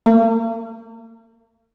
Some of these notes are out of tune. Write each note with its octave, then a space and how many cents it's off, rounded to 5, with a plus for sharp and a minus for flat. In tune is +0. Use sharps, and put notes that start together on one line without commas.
A#3 -40